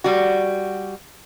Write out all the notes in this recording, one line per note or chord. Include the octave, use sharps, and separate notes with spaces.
G3 F#4